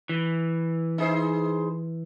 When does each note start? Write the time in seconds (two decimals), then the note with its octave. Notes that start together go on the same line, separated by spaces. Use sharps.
0.09 E3
0.98 D#4 G#4 C5